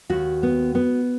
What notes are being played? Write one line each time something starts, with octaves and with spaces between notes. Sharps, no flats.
D#2 F#4
B3
B3